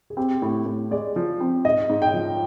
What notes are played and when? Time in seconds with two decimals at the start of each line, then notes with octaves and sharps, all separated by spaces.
0.10 G#4
0.17 C4 G4
0.42 A2
0.66 A2
0.91 G#3 D5
1.16 F3
1.40 C4
1.65 G#2 D#5
1.89 G#2
2.02 G5
2.14 F3